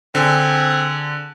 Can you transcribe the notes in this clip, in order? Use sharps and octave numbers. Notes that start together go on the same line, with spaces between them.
D3 C4 G#4